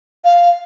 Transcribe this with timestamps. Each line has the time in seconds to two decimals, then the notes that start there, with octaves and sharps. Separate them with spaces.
0.25 F5